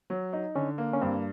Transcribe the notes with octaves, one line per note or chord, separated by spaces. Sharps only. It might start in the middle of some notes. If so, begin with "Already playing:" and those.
F#3
D#4
D3 C#4
A#3
C#4
G2 C4